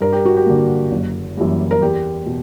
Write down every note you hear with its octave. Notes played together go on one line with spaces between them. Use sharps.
G2 A#4
G4
F#4
G4
D3 A#3
F#1
F#2 E3 G3 A#3
A#4
E2 G4
B2